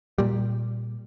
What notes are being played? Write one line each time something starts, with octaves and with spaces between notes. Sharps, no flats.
A#2 G3